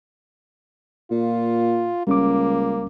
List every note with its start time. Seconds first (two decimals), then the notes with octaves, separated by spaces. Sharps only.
1.11 A#2 F4
2.07 C#2 G3 A#3 C#4 D6